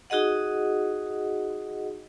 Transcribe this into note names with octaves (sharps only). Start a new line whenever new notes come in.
D#4 F#4 G#4 D#5 F#5